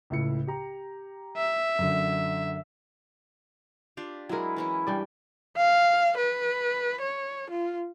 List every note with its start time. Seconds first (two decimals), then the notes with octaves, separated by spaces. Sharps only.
0.10 C#2 A2 C#7
0.47 G4 A#5
1.37 E5
1.79 F#2 D3
3.97 D4 F4 G4
4.29 F#3 G#3 E4 A#4
4.56 E3 C#4 E4
4.87 G2 G3 D5
5.57 F5
6.17 B4
7.01 C#5
7.50 F4